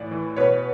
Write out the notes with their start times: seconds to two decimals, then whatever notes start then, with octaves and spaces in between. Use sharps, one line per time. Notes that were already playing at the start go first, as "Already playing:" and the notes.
Already playing: A2 E3 D5
0.11 E3
0.37 B2 B4 C#5